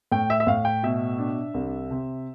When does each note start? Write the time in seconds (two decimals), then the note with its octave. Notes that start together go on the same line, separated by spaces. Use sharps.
0.12 A2 G5
0.30 E5
0.40 E5
0.47 A2 F5
0.65 G5
0.83 B2 E5
1.19 D4
1.54 C2
1.91 C3